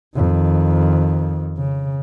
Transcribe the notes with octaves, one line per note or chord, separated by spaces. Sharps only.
F2 D#3
C#3